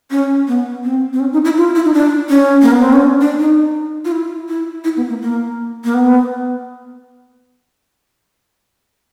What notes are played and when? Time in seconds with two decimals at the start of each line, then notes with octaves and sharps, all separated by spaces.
0.11 C#4
0.48 B3
0.84 C4
1.13 C4
1.20 C#4
1.33 D#4
1.45 E4
1.57 F4
1.75 E4
1.85 D#4
1.94 D4
2.29 C#4
2.62 A#3
2.72 B3
2.82 C4
2.93 C#4
3.02 D4
3.21 D4
3.39 D#4
4.05 F4
4.12 E4
4.49 E4
4.84 E4
4.97 B3
5.09 A#3
5.22 A#3
5.84 A#3
5.94 B3